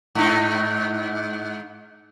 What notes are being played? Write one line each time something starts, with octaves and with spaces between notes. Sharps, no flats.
G#2 D#4